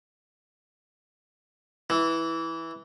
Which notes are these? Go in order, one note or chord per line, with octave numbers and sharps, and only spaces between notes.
E3